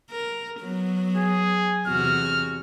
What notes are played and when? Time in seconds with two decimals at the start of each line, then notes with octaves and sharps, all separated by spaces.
0.11 A#4
0.61 F#3 B3
1.17 G#4
1.87 E2 C3 F#4 F6